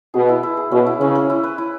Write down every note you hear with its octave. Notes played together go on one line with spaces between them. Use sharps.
B2 G#4
E4
E4
G#4
B2 C#4
E4
C#3 C#4
C#4
E4
B4
E4